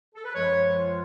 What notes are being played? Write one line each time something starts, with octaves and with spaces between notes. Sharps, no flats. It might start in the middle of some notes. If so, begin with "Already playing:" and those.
A4
B4
F#2 F3 G#3 C#5
F4